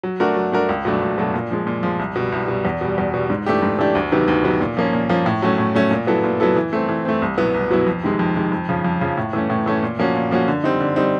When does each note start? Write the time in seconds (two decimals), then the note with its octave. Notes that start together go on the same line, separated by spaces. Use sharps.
0.03 F#3
0.20 A3 D4 F#4 A#4
0.36 F#3
0.52 A3 D4 F#4 A#4
0.69 C#2
0.85 B2 F#3 A3 D4
1.01 C#2
1.18 B2 F#3 A3 D4
1.34 A#2
1.51 F3 G#3
1.67 A#2
1.83 F3 G#3
1.99 C2
2.16 B2 G3
2.32 C2
2.48 B2 G3
2.65 E2
2.81 B2 G3
2.98 E2
3.14 B2 G3
3.30 G#2
3.46 E3 A3 D4 G4
3.62 G#2
3.79 E3 A3 D4 G4
3.95 D2
4.12 C3 D#3 F#3 B3
4.28 D2
4.44 C3 D#3 F#3 B3
4.60 A#2
4.77 F3 A#3 C#4
4.93 A#2
5.09 F3 A#3 C#4
5.26 A2
5.42 F#3 A3 C#4
5.58 A2
5.75 F#3 A3 C#4
5.91 A#2
6.07 F#3 B3 E4 A4
6.24 A#2
6.40 F#3 B3 E4 A4
6.56 E3
6.73 A3 C4
6.89 E3
7.05 A3 C4
7.22 C2
7.38 B2 F#3 B3 E4
7.54 C2
7.71 B2 F#3 B3 E4
7.87 F2
8.03 C3 D#3 G#3
8.19 F2
8.36 C3 D#3 G#3
8.52 F2
8.69 C#3 F3
8.85 F2
9.01 C#3 F3
9.17 A2
9.33 E3 A3 C#4
9.50 A2
9.66 E3 A3 C#4
9.83 A#2
9.99 F3 A#3 C#4 F#4
10.15 A#2
10.31 F3 A#3 C#4 F#4
10.48 D3
10.64 G3 C4 D#4
10.81 D3
10.96 G3 C4 D#4